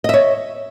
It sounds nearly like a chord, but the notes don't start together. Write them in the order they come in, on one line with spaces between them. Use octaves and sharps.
D#5 E5 C#5